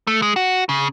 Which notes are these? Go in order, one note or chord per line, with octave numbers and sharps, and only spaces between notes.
A3
G#3
F#4
C#3